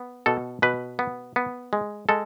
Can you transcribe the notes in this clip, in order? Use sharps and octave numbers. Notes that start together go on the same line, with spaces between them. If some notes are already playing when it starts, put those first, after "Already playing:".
Already playing: B3
B2 A4
B2 B4
B3
B3
G#3
G#3 A4